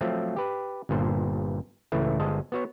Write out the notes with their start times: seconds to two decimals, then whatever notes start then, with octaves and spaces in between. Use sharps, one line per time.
0.01 F3 F#3 A3 C4
0.36 G4 B4
0.89 G1 G2 A#2 C5
1.92 C#2 A2 E3 A3
2.19 G1 G#3 C5 D#5 A5
2.52 B3 F#4 C#5